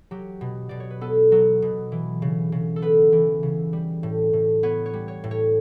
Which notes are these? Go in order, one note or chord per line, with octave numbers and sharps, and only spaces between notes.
F#3 G4
B2
B2 D5
C#5
B4
B3 A4
F#3
B2
E3
C#3
C#3
A4
B3 B4
E3
C#3
G3
A2
A2
B3 C#5
C#5
G3
C#5
A2
C#5